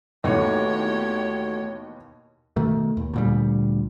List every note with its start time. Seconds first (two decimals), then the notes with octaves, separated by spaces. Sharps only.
0.24 D#2 B2 E3 A3 F#4 G4 C#5 G5
2.56 B2 D#3 A3
2.97 D#2
3.14 D2 A#2 G3